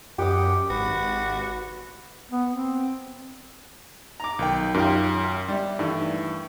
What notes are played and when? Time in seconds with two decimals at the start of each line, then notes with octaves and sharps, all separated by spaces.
0.18 F#2 G4 F#5 G5 D6 D#6
0.70 G#1 F#4 B4
2.31 B3
2.50 C4
4.20 A#5 D6
4.39 B1 D#3 G5
4.74 F#2 D#3 F4 G4
5.48 G3 E4
5.79 G2 D#3 E3 A3